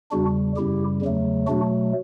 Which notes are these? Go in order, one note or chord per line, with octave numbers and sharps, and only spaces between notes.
E2 C#3 G3 D4 F#4
F#2 C#3 G3 E4 G4
E2 C#3 F#3 A3
B2 F#3 A3 D4 F#4